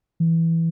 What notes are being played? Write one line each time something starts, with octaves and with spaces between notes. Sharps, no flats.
E3